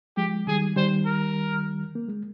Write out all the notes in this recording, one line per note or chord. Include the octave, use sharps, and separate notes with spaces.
F3 G#3 G4
D#3 G3 G#4
D#3 G3 C5
A#4
A#3
G#3